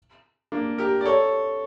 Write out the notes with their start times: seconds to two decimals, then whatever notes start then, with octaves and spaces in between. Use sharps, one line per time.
0.52 A#3 D4
0.78 G4 A#4
1.01 D5
1.06 A4 C#5